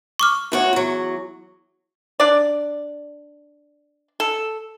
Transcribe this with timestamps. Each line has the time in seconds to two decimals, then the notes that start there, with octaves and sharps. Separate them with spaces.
0.19 C#6 D6 F6
0.52 D2 F#4 C#5
0.73 E2 F#3
2.20 D4 D5
4.20 A4